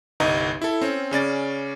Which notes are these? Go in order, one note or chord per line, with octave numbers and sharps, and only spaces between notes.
G1 C2 D#4 B4 D#5 A#5
E4 A4
C4 C#4
C#3 C#4 D5 A6